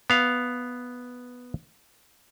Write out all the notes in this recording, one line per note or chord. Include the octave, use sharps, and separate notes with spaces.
B3 F5